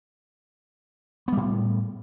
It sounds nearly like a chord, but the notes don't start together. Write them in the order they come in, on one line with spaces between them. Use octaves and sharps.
B3 G3 A2